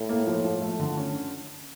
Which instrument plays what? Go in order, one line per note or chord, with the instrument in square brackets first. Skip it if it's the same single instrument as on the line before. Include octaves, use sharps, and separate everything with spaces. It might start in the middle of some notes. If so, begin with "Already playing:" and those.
Already playing: [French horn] A2
[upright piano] A#3
F3
F3
A3
D3
C#4